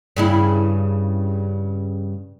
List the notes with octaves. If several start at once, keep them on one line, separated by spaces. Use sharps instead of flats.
G2 C#3 E4